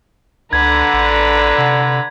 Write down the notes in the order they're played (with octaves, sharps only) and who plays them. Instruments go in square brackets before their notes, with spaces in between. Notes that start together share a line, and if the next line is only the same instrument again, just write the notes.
[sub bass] C#2 [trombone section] D3 [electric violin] B4 A#5 [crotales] G#6
[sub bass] A1
C3